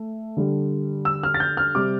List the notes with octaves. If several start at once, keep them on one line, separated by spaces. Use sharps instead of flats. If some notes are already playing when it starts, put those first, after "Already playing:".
Already playing: A3
D3 G3
E6
F6
A6
G6
F6
C3 G3 D6